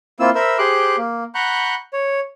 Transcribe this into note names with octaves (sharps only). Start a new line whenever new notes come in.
A#3 C4 E4 F4 E6
A#4 C5 E5 B5 E6
G4 G#4 C5 C6 D6 F#6
A#3
F#5 A#5 B5 C#6 F#6 G6
C#5